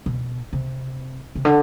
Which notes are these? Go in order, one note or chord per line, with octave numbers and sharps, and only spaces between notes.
B2
C3
C3
D3